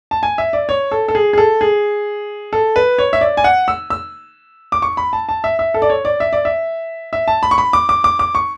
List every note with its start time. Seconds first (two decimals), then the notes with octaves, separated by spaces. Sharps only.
0.11 A5
0.23 G#5
0.38 E5
0.53 D5
0.69 C#5
0.91 A4
1.08 A4
1.15 G#4
1.33 G#4
1.38 A4
1.61 G#4
2.53 A4
2.76 B4
2.98 C#5
3.13 E5
3.21 D5
3.37 G#5
3.44 F#5
3.68 E6
3.90 E6
4.72 D6
4.82 C#6
4.97 B5
5.13 A5
5.29 A5
5.44 E5
5.59 E5
5.74 A4
5.82 D5
5.90 C#5
6.05 D5
6.20 E5
6.33 D5
6.45 E5
7.13 E5
7.28 A5
7.43 B5
7.51 C#6
7.58 B5
7.73 D6
7.89 D6
8.04 D6
8.19 D6
8.35 C#6